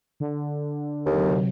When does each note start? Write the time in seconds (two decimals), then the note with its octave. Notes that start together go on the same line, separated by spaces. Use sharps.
0.20 D3
1.06 D#2 C3 F#3